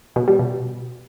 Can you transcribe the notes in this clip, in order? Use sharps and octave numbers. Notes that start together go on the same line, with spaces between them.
B2
G3
B2